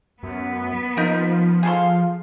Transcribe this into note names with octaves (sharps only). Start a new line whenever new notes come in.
F#2 B3
F3 D#4 A#4
G#4 A4 F5 C6